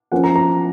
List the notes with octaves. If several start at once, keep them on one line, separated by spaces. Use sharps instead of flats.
F3 A#3 C#4 F#5
A#5
A#5